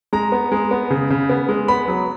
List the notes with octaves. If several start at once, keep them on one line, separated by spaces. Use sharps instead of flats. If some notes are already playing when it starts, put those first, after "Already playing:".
G#3 A#5
B3
G#3
B3
C#3
C#3
B3
G#3
B3 B5
F#3